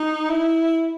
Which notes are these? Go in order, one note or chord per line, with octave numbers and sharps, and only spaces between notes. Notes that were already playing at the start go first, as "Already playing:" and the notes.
Already playing: D#4
E4